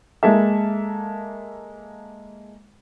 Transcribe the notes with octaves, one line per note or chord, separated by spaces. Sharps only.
G#3 A#3 A4 E5